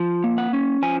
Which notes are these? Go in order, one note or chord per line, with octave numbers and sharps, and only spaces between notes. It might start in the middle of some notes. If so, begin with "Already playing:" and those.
Already playing: F3
A#3
F#5
C#4
F3 G#5